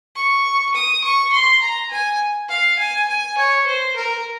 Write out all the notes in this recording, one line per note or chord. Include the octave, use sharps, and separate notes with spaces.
C#6
D#6
C#6
C6
A#5
G#5
F5
G#5
G#5
C#5
C5
A#4